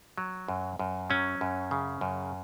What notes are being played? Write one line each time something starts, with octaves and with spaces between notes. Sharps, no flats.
F#3
F#2
F#2
F#3 C#4
F#2
C#3
F#2